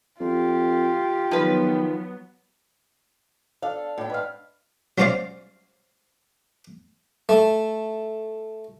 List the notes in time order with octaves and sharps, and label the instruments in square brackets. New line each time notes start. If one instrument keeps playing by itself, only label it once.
[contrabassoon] F2 [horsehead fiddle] F4 G4
[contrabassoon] D#3 [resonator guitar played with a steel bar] F3 B4 [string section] F#3 B3
[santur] D4 A4 [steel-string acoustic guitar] F5
[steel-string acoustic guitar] A2 [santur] D4 G5
[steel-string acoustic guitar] G#2 [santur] B4 F5
[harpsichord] F#3 G#3 C#4 C5 D5 F5
A3